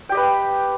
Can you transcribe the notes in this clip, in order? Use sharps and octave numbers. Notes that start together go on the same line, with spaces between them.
G4 B4 D#5 G5